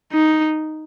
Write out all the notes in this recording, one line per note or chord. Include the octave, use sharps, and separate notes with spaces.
D#4